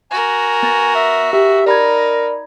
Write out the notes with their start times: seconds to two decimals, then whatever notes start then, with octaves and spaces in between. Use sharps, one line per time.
0.11 F#4 A#4 G#5
0.63 B3 A6
0.95 E5
1.33 G4 E5
1.66 D#4 A#4 D5 B5 G#6